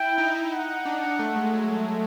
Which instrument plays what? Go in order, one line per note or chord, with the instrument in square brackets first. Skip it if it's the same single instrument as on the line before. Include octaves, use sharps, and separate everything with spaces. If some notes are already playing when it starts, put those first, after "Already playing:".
Already playing: [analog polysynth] E4 [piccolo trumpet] G5
[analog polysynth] D#4
[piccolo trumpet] F#5
[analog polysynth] D4
A3
G#3
F#3